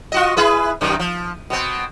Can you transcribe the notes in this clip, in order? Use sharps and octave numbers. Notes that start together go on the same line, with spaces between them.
F4 F#4 D#5
E4 G#4 B4
F#2 C3 D#3
F3
B2 C4